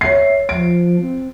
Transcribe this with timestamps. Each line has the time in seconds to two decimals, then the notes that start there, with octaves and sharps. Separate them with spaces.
0.01 C#5 E5 C7
0.49 F3 D7
1.01 C4